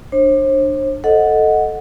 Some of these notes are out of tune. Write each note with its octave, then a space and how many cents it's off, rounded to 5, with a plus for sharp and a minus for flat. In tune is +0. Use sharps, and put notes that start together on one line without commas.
D4 +30 C5 +45
A4 +0 D#5 +0 F#5 -10